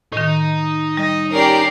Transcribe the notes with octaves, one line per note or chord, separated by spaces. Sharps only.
A2 D#3 D#4
G3 D#5 A#6
C#4 G4 A#4 D5 C7